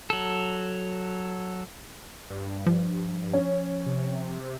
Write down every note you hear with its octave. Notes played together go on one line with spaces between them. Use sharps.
F#3 A4
G2
F3
C#4
C3